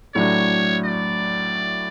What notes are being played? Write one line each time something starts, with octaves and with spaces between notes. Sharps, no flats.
A2 F#3 A3 D4 C#5
D5